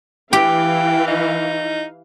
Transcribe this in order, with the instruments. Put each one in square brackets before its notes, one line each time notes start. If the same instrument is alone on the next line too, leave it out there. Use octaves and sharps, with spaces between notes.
[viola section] E3 F5 [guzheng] G4 [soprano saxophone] G5
[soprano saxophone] D#4